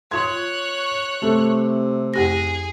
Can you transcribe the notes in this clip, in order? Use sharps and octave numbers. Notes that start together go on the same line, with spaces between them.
F4 C#5 C6 F#6 G#6
C3 A3
F2 G4 G#4 G#5 A#6